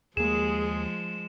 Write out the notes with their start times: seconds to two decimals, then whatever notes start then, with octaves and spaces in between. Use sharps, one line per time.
0.17 D#2 F3 G#3 A#3 G#4 E7